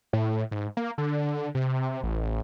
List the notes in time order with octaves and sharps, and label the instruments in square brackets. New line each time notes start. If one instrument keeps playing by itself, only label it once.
[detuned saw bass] A2
G#2
A#3
D3
C3
A1